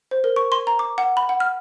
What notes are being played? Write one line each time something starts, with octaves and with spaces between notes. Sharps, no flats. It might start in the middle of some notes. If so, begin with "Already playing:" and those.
C5
A#4
C#6
C6
A#5
D6
F#5
B5
F#5
F6